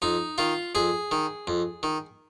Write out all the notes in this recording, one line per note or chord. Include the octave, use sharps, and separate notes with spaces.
F2 D#4
D#3 F4
F2 G#4
D#3
F2
D#3